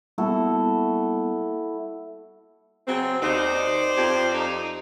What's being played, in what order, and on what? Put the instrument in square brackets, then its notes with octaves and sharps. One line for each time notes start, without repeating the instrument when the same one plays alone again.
[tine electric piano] G3 A#3 B3 [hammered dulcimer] E4 F#4 A4
[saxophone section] C#3 F#3 C4
[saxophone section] D#2 D#4 [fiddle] C5 D5
[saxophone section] F2 G4
[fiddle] D#4